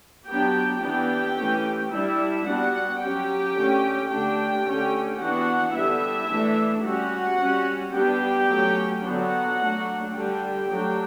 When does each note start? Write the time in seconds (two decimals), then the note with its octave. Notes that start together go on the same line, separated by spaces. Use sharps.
0.27 F#3 B3 D4 G4 G5
0.81 E3 B3 D4 G4 G5
1.36 E3 A3 C#4
1.91 G3 D4 E4 E5
2.46 G3 B3 D4 F#4 F#5
3.00 F#3 C#4 G4 G5
3.55 D3 A3 C#4
4.10 D3 A3 D4 G4 G5
4.65 D3 A3 C#4
5.19 E3 B3 D4 F#4 F#5
5.74 D3 G3 B3 E4 E5
6.29 E3 A3 D4
6.84 G3 C#4 F#4 F#5
7.39 G3 C#4
7.94 G3 B3 D4 G4 G5
8.49 F#3 A3 C#4
9.03 D3 F#3 B3 D4 F#4 F#5
9.58 F#3 A3 D4
10.13 D3 G3 D4 G4 G5
10.68 F#3 A3 D4